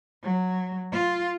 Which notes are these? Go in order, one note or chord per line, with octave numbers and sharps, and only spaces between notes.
F#3
F4